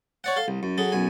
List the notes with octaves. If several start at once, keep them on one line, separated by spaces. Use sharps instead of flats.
C#5 D5 F#5
A4 F5
C2
F#2
F#3 G#4 A4
B1 F#2 G#5